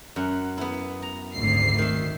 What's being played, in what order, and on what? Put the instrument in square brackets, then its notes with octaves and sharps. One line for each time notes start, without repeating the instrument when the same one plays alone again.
[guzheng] F#2 F#5
B3 E4
A#5
[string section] G#1 D2 C7
[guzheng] D#3 E5